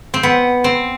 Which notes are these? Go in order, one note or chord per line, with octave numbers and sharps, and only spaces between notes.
C4
B3
C4